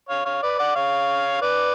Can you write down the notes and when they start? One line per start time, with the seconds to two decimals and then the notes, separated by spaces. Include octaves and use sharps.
0.09 C#5 F5
0.25 C#5 F5
0.42 B4 D5
0.58 D5 F#5
0.75 C#5 F5
1.42 B4 D5